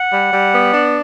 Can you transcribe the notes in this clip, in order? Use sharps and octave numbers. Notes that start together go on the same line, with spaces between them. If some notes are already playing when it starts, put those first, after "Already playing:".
Already playing: F#5
G3
G3
B3
D4